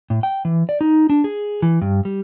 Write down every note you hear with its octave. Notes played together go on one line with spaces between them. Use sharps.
A2
G5
E3
D5
D#4
D4
G#4
E3
G2
G3